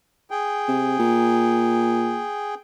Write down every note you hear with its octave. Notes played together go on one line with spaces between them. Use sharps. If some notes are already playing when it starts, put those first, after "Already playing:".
G#4 G5
C3
A#2